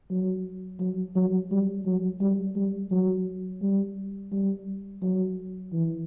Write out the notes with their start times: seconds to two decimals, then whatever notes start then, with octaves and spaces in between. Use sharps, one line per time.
0.11 F#3
0.80 F#3
1.16 F#3
1.51 G3
1.86 F#3
2.21 G3
2.56 G3
2.91 F#3
3.62 G3
4.32 G3
5.03 F#3
5.73 E3